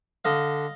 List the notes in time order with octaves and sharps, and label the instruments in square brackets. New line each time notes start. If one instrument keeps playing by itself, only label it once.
[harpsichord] D3 D#5 F5